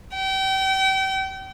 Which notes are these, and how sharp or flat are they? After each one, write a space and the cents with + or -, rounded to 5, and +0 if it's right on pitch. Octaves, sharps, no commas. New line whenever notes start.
G5 -35